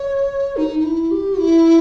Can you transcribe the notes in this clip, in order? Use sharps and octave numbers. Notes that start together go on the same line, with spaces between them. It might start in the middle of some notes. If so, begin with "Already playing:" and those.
Already playing: C#5
D#4
D#4
E4
G4
E4